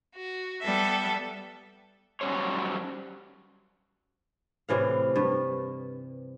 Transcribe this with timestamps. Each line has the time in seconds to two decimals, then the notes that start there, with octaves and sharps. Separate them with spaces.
0.14 F#4
0.62 G3 B3 A4 E5
2.21 F#3 G3 C#4 C5 C#5
4.69 A2 C3 E3 F5
5.16 G2